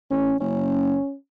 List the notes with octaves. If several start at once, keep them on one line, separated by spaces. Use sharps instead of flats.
A1 C#4
F#1 C#4